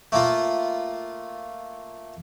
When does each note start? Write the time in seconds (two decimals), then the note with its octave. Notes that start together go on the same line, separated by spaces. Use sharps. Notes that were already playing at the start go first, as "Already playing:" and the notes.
0.12 A3 A#3 F4